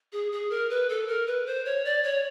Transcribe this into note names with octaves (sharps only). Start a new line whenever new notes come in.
G#4
G#4
A#4
B4
A4
A#4
B4
C5
C#5
D5
C#5